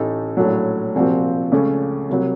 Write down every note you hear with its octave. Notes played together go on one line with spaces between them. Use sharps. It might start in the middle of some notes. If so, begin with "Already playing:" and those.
Already playing: A1 A2 A3 D#4
A#1 A2 F#3
C2 A#2 F3 C4 F#4
C#2 C#3 A3 C#4
C2 C3 F#3